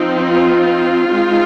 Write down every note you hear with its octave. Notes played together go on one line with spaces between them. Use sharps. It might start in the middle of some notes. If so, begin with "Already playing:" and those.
Already playing: F3 C4 D#4
F4
G#3 C4 D#4